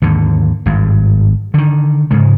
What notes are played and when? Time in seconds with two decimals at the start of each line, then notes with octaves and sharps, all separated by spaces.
0.02 D#2 G#2 D3
0.66 G#1 G2
1.54 D3 D#3
2.11 G#2 C#3 G#3